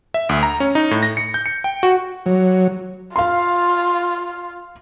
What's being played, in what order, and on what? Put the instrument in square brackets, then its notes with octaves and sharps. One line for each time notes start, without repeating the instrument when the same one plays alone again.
[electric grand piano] E5
D2
A#5
C#4
D#4
A2
A#6
C#7
G6
C#7
G5
F#4
[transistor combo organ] F#3
[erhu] F4 [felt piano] F5 C6